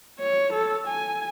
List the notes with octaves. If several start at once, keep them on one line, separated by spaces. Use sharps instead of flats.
C#5
A4
G#5